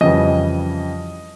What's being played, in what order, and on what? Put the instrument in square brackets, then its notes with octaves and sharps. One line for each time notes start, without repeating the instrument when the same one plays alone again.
[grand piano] F2 C#3 E3 G3 D#5